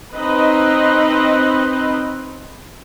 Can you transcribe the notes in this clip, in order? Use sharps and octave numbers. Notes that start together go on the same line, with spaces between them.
C4 D#4 B4 D#5